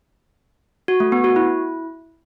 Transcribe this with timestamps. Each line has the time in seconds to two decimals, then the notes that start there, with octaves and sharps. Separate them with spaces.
0.88 F#4
1.00 A3
1.12 B3
1.24 F#4
1.36 E4